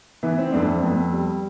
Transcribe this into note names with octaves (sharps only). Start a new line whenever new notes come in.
E3 B3
C4
F2 B3 D4
C4
F2 B3
G3